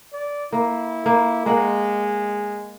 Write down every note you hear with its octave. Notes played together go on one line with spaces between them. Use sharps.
D5
A#3 E4
A#3
G#3 A#3 F#5